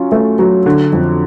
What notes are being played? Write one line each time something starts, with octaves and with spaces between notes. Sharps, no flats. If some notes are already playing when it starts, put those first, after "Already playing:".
Already playing: F#3 C#4 F4
A3
F#3
D3
F2